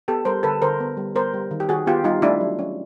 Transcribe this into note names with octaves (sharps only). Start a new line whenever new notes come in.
B3 G4 A4
G3 A#4 C5
D3 A4 B4
D3 A#4 C5
B3
G3
B3 A#4 C5
G3
D#3
G4
D#3 F#4 G#4
B3 F4 G4
G3 D#4 F4
A3 D4 E4
F#3
C#4